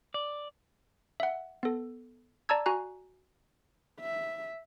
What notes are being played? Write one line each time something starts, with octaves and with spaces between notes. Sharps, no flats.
D5
E5 F#5
B3 A4
D5 A5 A#5 E6 G#6
F#4 G#5 A#5 F#6
E5